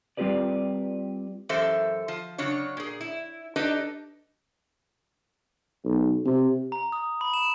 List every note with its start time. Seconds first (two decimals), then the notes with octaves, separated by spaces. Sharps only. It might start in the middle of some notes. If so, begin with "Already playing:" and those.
0.17 G3 C4 F4 G4 B4 D5
1.49 F#2 E3 G4 A4 C5 E5
2.08 F3
2.38 C#3 F#3 D4 C#5
2.77 A#2 G#4
3.01 E4
3.56 D4 D#4 G4 A4 B4 D#5
5.85 B1
6.26 C3
6.72 A#5
6.92 D#6
7.21 B5
7.33 E7